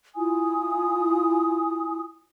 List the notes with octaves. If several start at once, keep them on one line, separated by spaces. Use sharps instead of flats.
E4 F4 G#5 D#6